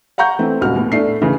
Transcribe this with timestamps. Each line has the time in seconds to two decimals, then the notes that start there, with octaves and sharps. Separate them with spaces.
0.18 F5 F#5 A#5 C#6 G6
0.39 E3 A3 C4
0.61 D#1 C#2 F#4 F6
0.75 E2 A2
0.92 A2 A3 D4 C7
1.22 D2 C#3 E3